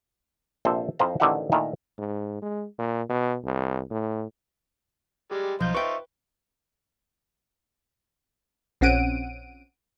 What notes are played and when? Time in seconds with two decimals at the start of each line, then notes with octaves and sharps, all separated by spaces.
0.65 A#1 C3 A4 C5
0.99 F2 F3 E4 C5 F5 A#5
1.20 A1 D3 D#3 G4 E5 F#5
1.52 A#2 D#3 A3 E4 A#4 A5
1.98 G#2
2.42 G#3
2.79 A#2
3.09 B2
3.45 C2
3.90 A2
5.31 G3 G#3 G4
5.60 B1 F3 D#4 F4 C5 G6
5.75 B4 E5 G5 C#6
8.81 A#1 C4 C#4 F#5 D7 D#7